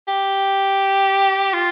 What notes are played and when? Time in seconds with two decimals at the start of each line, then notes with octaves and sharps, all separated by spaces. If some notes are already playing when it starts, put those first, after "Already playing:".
0.08 G4
1.54 F4